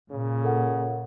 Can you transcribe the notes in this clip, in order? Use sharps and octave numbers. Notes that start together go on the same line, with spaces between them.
A#2 C#3
A4 A#4 F#5